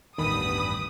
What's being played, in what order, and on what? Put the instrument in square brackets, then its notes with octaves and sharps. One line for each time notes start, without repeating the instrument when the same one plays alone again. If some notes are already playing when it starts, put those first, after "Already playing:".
[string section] A1 B4 [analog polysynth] E2 G2 B5 [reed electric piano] D#3 [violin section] D#6